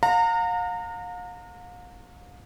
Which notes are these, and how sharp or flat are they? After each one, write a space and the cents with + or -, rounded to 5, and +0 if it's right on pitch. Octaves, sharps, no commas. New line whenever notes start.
F5 +40 A#5 -25